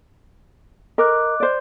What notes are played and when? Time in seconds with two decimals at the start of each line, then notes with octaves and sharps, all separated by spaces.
0.98 A#4 D#5 D6 F#6
1.40 C5 D5